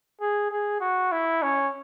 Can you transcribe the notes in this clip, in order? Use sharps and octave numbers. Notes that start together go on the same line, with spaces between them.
G#4
G#4
F#4
E4
C#4